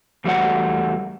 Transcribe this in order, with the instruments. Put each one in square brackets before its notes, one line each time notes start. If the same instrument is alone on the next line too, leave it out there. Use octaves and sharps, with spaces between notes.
[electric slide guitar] E2 G3 A3 F#4 D5 F#5